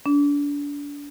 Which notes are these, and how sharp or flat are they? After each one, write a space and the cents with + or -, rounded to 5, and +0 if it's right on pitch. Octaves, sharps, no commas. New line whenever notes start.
D4 -30